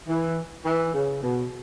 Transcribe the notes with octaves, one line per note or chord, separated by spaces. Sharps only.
E3
E3
C#3
B2